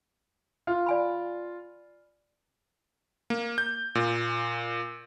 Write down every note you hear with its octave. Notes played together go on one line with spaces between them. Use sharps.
F4
D5 G#5 B5
A#3
G6
A#2